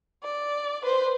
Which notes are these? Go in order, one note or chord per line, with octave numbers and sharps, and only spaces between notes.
D5
B4 C5